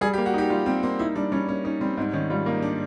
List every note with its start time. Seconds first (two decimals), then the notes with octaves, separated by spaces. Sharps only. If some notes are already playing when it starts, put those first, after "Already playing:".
0.01 G3 G#4
0.14 G4
0.18 A#3
0.26 F#4
0.34 D#4 G4
0.50 G3 F4
0.66 G3 C4
0.83 A#3 C4
0.99 D#4 E4
1.16 G3 D4
1.32 G3 C#4
1.48 A#3 C#4
1.64 C#4 D#4
1.81 G3 C4
1.97 G#2 C4
2.13 D#3 C#4
2.30 G3 F4
2.46 A#3 D#4
2.62 D4